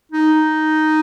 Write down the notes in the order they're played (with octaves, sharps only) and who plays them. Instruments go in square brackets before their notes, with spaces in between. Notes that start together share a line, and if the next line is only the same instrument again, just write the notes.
[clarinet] D#4